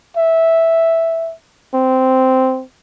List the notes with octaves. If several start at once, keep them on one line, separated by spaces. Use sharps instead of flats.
E5
C4